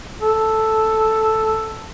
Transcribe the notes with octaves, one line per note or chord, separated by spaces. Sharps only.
A4